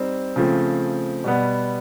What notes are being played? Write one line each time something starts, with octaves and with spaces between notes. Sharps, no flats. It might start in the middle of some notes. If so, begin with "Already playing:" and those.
Already playing: G3 C4 D#4
C#3 F3 A3 C4
B2 G3 B3